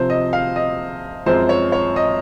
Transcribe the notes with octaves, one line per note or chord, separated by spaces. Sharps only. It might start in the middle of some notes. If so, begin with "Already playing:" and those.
Already playing: C3 F3 C4 C5
D#5
F5
D#5
F#2 F3 G#3 C4 C5
C#5
C#5
D#5